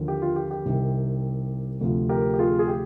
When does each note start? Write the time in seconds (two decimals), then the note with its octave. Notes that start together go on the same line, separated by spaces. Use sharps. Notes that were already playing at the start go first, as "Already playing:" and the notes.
Already playing: D#2 D3 F3
0.08 G4
0.22 F4
0.36 G4
0.51 G4
0.66 C2 C3 D#3
1.81 D2 C3 F3
2.09 G4 A#4
2.34 G4
2.39 F4 G#4
2.59 G#4
2.68 G4